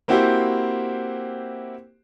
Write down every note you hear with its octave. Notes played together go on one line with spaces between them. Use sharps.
A#3 C4 E4 F#4 G4 C5